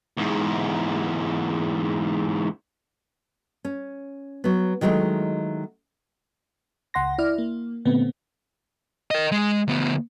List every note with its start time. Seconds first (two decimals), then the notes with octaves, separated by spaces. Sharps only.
0.17 E2 G#2
3.65 C#4
4.44 F#3 B3
4.81 D#3 F#3 G#3 A3 E4
6.94 C#2 F#5 C6 A#6
7.18 E4 D5 F6
7.38 A#3
7.85 A#2 D3 A3 B3 C4
9.11 A#4 D#5
9.32 G#3
9.68 D2 B3